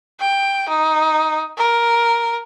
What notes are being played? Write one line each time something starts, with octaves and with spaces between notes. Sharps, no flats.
G5
D#4
A#4